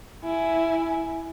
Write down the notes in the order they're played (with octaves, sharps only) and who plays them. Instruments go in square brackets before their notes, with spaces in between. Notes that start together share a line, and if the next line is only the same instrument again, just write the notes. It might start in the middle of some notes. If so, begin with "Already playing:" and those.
[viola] E4 G#5